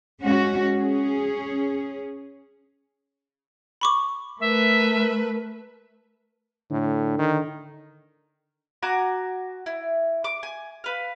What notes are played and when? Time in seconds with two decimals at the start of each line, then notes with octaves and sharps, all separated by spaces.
0.21 G#3 C#4 F#4
0.75 C#4 G#4
3.81 B5 C#6 D6
4.40 A3 A#4 B4 E5
6.71 A2 D3
7.19 D#3
8.83 F#4 G#5 A#5 D6
9.66 E4
10.24 D6
10.43 G#5
10.84 B4 F5